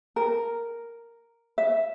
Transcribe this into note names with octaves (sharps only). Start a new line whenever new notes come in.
A#4
E5